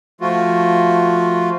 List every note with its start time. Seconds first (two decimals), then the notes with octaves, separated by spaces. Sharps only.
0.21 F3 A3 F4 F#4